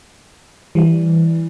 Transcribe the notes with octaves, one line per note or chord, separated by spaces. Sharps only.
E3 G3